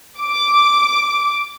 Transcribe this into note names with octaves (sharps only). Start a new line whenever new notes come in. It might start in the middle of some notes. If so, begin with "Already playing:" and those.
D6